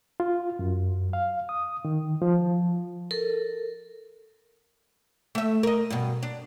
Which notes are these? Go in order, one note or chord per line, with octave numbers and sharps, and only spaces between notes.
F4
F#2
F5
D#6
D#3
F3
A4 A#4
A3 E5
A#4 D#5
G2 B2
D4